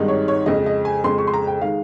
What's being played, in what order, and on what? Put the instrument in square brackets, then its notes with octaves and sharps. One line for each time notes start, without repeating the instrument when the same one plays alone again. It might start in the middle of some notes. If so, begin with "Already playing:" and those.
Already playing: [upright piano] G#1 G2 D#3 G#3 D#4
C#5
C#5
F2 C#3 G#3 D#5
D#5
G#5
F2 C#3 G#3 C6
C#6
C6
A#5
G5
D#3 G#3 F5